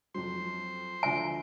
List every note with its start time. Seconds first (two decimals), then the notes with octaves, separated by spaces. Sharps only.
0.14 F2 F#3 C5 C6
1.03 D2 F3 E5 G#5